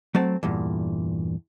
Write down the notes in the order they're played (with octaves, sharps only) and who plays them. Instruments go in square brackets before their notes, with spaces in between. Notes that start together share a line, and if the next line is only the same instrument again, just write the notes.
[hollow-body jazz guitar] F#3 A3 C4 A5
E2 G2 A#2